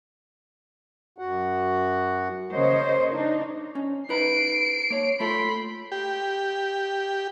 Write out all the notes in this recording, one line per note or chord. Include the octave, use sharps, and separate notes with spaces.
F#2 F#4 F#5
C#3 A#3 C5 C#5 D#5
D4 D#4
C#4
D#4 B4 A#5 C7 D7
A#3 C#5
A3 F4 A4 B5 C6
G4